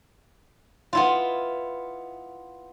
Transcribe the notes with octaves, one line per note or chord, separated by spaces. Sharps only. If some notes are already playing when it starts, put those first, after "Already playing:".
B3 E4 F4